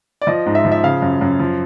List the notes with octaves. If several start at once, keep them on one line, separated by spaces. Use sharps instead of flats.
D5
F3 D#5
G#2
E5
F3
E5
C#3 F5
F#2
F#2
F3